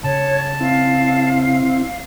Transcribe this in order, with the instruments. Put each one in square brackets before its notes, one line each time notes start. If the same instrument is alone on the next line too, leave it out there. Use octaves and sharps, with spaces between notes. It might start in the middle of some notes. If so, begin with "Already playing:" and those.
[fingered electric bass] C#3 [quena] C#5 [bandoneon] A5
[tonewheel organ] C4 E4 [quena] F5